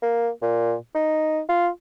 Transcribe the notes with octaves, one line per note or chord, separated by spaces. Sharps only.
A#3
A#2
D#4
F4